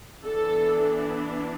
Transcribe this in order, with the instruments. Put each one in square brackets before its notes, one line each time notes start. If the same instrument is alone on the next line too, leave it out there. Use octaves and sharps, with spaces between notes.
[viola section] E3 B3 D4 A4